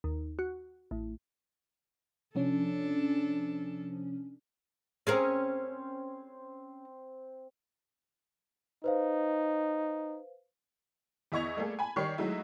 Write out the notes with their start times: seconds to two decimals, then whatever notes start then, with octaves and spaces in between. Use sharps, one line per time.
0.04 D#2
0.39 F#4
0.91 A1
2.35 C3 F3 C#4 D4 A4
5.07 C4 C#4 G#4 A#4 C5
8.84 D#4 B4 C5 F5
11.32 E2 E4 D#5 C#6 G#6 F7
11.57 G3 A3 A#3 G#4 A4
11.79 G#5 A5 B5
11.96 D#3 G3 G4 C#5 C#6 C7
12.18 F#3 G#3 A3 D#4 E4